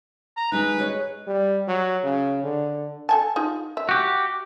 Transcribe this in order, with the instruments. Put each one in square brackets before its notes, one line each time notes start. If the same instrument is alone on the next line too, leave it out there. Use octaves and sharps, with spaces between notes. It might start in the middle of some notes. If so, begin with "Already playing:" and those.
[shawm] A#5
[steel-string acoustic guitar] G#3 D#4 [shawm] B4
[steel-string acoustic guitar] G#4 C#5 D#5
[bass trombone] G3
F#3
C#3
D3
[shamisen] A4 G#5 A5
D#4 F4 G#4
E5
[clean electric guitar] F#4 G4